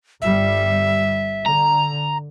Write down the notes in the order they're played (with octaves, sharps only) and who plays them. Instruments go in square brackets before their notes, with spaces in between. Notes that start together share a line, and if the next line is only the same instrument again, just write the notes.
[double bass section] G1 G3 [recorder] E5
[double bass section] D3 [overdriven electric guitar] A#5